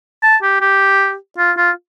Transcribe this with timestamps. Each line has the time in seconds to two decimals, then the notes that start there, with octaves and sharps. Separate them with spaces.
0.23 A5
0.42 G4
0.61 G4
1.38 F4
1.57 F4